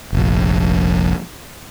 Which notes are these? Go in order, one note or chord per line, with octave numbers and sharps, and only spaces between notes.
F1 A#1